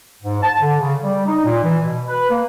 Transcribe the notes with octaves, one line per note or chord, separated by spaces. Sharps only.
G#2
A5
D3
C#3
G3
D#4
A#2
E3
B2
B4
A#3